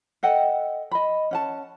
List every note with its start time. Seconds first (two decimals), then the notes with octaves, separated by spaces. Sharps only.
0.23 A4 D#5 F#5 G5
0.91 D#5 B5
1.31 C#4 F#5 A5